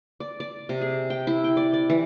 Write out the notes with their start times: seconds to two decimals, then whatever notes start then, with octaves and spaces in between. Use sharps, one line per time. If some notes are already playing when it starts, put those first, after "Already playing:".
0.20 D5
0.40 D5
0.69 C3
0.81 G#4
1.10 G5
1.27 E4
1.44 G5
1.57 D5
1.74 D5
1.90 E3